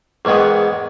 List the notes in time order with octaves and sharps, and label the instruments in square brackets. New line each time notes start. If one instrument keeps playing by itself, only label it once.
[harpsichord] E2 G#2 D#3 G#3 B3